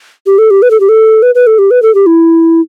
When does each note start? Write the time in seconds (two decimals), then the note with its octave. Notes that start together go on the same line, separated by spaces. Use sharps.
0.26 G4
0.38 A4
0.51 G4
0.62 B4
0.71 A4
0.80 G4
0.89 A4
1.22 B4
1.35 B4
1.47 A4
1.59 G4
1.71 B4
1.82 A4
1.95 G4
2.06 E4